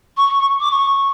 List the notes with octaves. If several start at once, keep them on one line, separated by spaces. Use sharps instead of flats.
C#6
D6
C#6